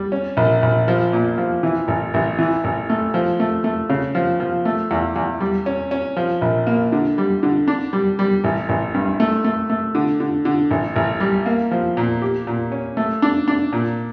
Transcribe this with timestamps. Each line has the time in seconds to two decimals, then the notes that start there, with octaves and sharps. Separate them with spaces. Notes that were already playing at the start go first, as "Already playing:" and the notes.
Already playing: G3
0.12 C#4
0.37 A#1
0.62 A#1
0.88 F3
1.13 A#2
1.38 F3
1.63 E3
1.88 A1
2.14 A1
2.39 E3
2.64 A1
2.90 A3
3.14 F3
3.40 A3
3.64 A3
3.90 C#3
4.15 F3
4.40 F3
4.65 A3
4.91 E2
5.16 E2
5.40 G3
5.66 C#4
5.91 C#4
6.16 F3
6.41 A#1
6.67 A#3
6.92 D3
7.18 G3
7.43 D3
7.68 D4
7.93 G3
8.19 G3
8.44 A1
8.69 A1
8.94 G2
9.20 A3
9.44 A3
9.70 A3
9.95 D3
10.20 D3
10.45 D3
10.71 A1
10.96 A1
11.20 G3
11.46 A#3
11.71 F3
11.97 A#2
12.22 G4
12.47 A#2
12.72 C#4
12.97 A3
13.22 D4
13.48 D4
13.73 A#2